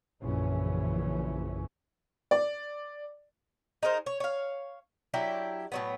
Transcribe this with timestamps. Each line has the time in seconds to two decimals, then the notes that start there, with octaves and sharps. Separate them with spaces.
0.21 A#1 F#2 C#3 E3 C#4
2.31 D5
3.83 D#4 G#4 A#4 C5
4.06 C#5
4.20 C#5 F5
5.14 F#3 D4 E4 G4
5.72 A2 F#3 B3